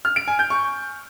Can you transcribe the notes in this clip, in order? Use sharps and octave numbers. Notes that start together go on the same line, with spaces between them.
F6
D7
G#5
G6
C#6